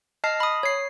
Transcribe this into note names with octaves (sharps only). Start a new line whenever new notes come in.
D#5 A5 F6 A#6 C7
B5 D#6
C#5 C7